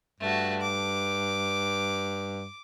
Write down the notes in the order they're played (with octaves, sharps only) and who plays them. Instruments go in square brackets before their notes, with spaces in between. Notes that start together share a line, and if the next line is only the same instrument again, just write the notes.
[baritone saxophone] G2 [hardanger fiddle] A3 F#4
[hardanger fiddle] D6